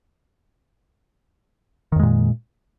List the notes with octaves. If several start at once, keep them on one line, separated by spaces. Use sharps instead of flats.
F2 A#2 D#3 G#3